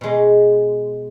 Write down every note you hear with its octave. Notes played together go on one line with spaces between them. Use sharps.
B2 G#3